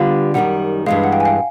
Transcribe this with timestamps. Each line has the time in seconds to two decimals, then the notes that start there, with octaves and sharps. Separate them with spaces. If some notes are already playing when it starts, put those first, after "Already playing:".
Already playing: D3 G3 B3 D4 F4 F5
0.34 F#2 D#3 G3 F#5
0.86 G2 E3 G#3 F5
1.04 F#5
1.12 F5 G5
1.20 G#5
1.25 F5 G5